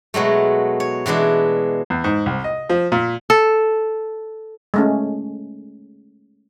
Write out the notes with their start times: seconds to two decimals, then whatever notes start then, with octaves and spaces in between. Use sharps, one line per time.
0.14 B2 F#3 G#3 A3
0.80 C#5
1.06 B2 E3 G#3 D4
1.90 E2
2.04 G#2
2.26 C2
2.44 D#5
2.69 F3
2.92 A#2
3.30 A4
4.74 G#3 A3 C#4